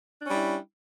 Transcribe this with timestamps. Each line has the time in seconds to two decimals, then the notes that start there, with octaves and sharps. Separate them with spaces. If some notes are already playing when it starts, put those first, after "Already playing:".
0.21 D4
0.25 C#4
0.29 G3
0.34 E4